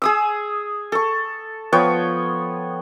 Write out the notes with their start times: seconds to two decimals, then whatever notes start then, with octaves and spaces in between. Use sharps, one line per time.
0.02 G#4 D#6 E6
0.92 A4 C#6
1.73 F3 B3 C#5 G5